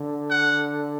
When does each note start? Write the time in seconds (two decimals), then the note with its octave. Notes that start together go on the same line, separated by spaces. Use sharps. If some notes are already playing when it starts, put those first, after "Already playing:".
Already playing: D3
0.30 F#5